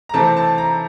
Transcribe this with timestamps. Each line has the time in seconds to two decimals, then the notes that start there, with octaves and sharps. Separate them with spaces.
0.09 A#5
0.14 C3 E3 A3 C4 A5
0.36 A5
0.58 A#5